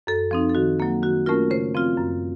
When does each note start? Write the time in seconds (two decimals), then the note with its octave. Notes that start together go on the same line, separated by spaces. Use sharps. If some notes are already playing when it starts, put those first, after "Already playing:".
0.07 F#2 A4
0.31 F3 C4 D#4
0.49 A4
0.55 D#3 F#4
0.80 F#3 A#3
1.02 D#3 F#4
1.26 A3 C#4 F4 A#4
1.50 C#3 C5
1.75 F3 C4 F4
1.98 F#2